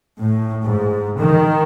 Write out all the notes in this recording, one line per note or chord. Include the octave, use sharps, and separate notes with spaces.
A2
G#2
D#3